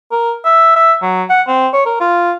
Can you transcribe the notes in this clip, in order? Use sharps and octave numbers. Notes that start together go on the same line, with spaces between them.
A#4
E5
E5
F#3
F#5
C4
C#5
A#4
F4